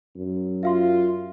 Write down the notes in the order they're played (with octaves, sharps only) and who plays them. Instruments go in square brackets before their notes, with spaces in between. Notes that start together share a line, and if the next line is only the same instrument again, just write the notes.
[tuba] F#2
[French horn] F4 [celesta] E5 F5 C6